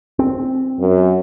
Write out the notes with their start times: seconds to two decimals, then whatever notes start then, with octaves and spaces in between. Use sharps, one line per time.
0.19 C4
0.80 F#2